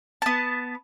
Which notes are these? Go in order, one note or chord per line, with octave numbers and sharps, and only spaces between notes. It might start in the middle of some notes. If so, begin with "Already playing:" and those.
B3 A5